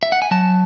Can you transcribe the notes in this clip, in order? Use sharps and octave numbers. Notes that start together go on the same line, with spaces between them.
E5
F#5
G#5
F#3 A5